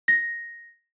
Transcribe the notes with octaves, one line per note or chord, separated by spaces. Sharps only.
A#6